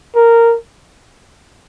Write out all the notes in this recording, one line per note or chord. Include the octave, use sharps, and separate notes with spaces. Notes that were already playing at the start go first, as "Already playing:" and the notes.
A#4